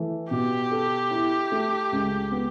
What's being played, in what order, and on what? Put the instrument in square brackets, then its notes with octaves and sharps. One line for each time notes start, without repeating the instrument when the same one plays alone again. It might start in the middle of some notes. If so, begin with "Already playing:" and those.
Already playing: [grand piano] E3 A3
[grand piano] B2 [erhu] G4
[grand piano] A4
E4
A3
C#2
B3